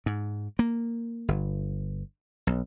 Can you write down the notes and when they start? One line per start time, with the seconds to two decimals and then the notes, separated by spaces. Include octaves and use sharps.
0.06 G#2
0.59 A#3
1.28 G1
2.47 B1